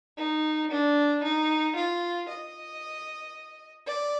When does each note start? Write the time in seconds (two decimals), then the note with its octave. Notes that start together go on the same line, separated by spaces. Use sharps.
0.17 D#4
0.70 D4
1.23 D#4
1.76 F4
2.29 D#5
3.87 D5